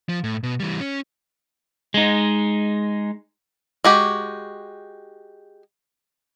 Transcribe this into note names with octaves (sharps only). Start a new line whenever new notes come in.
F3
A2
B2
E3 G3
C#4
G#3 D#4
G#3 F#4 G4